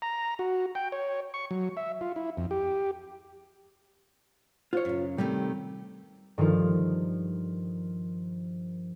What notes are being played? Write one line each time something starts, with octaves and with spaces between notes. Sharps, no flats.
A#5
F#4
G5
C#5
C#6
F#3
E5
F4
E4
F2
G4
F4 C5 C#5
F#2 C#3
C3 D#3 G3 A3
G2 D#3 F3 F4